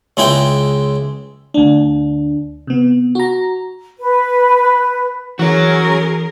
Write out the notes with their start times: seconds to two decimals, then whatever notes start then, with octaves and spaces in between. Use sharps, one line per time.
0.17 C#2 G#3 E4 G5
1.54 D2 D4
2.67 C3 B3
3.15 F#4 A#5
3.99 B4
5.39 E3 C#4 F#4 G#4 A#4 C#5